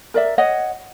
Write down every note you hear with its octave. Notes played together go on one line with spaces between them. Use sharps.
A#4 D5 E5
C#5 D#5 F#5